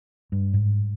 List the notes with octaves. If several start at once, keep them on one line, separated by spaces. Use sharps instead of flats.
G2
G#2